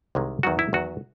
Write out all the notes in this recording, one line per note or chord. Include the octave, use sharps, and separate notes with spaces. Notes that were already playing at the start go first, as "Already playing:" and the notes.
C2 C3 D#3 G#3
E2 D#3 F#3 F#4
E4
E2 D#3 F#3 F#4